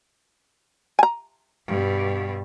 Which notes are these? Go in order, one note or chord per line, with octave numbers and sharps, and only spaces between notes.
G#5 A#5
G2 B2